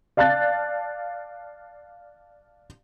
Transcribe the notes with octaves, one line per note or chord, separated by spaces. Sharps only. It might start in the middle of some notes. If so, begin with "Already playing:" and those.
D5 F5 A5 F#6 A6